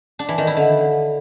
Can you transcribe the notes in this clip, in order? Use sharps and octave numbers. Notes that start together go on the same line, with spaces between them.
D4
E3
D#3
E4
D3